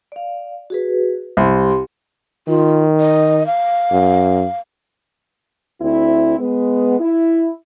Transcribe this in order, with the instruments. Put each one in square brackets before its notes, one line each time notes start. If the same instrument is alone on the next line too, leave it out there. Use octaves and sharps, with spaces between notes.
[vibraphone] D5 F5
F#4 G#4 B4
[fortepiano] C2 [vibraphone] G4 C6
[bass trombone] D#3 [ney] F4
[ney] D#5
F5
[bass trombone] F#2
[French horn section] D2 C4 E4
G#3 B3
E4